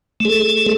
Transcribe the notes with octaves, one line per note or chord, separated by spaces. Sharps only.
A3 G#4 A4